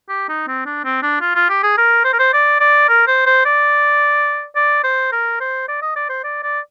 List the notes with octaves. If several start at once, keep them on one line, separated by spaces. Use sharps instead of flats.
G4
D#4
C4
D4
C4
D4
F4
F4
G4
G#4
A#4
C5
A#4
C5
D5
D5
A#4
C5
C5
D5
D5
C5
A#4
C5
D5
D#5
D5
C5
D5
D5